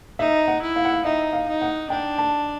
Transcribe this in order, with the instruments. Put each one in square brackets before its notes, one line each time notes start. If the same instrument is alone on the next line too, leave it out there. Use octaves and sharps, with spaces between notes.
[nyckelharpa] D#4 [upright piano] E5
[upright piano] F#5
[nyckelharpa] E4
[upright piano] F5
F#5
F5
[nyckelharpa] D#4 [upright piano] E5
[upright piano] F5
[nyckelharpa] D#4
[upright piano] F#5
[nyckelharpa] D4 [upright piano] G5
[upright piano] A5